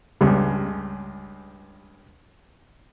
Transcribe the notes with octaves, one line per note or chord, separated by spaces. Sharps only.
C#2 G2 C#3